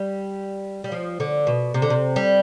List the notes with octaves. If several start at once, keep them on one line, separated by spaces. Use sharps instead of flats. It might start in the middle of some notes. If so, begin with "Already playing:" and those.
Already playing: G3
G3
F3
D3
B2
C3
D3
C3
G3